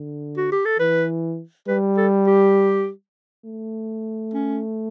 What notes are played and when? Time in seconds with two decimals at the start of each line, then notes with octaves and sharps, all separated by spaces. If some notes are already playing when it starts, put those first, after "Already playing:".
Already playing: D3
0.37 F#4
0.52 G4
0.65 A4
0.79 E3 B4
1.68 G3 B4
1.98 A4
2.27 G4
3.45 A3
4.34 C#4